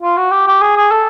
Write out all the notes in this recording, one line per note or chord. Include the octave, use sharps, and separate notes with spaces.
F4
F#4
G4
G4
G#4
G#4
A4